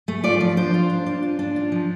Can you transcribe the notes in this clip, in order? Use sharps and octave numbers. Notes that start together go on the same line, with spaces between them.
A3
F4 D5
F3
D4 C5
F4
D4
D4
F4
D4
F4
F3